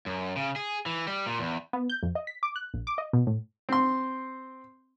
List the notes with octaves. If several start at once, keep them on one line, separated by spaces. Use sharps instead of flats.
F#2
C#3
G#4
E3
G3
A#2
E2
B3
G6
F2
D#5
B6
D6
F#6
A#1
D6
D#5
B2
A2
C4 C6